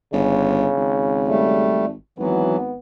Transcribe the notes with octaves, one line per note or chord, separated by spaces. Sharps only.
G1 C#3
G#1
G3 A3
G#1 E3 F#3 B3